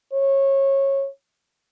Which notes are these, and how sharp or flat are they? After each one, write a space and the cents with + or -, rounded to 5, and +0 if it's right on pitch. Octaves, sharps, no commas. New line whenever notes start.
C#5 -20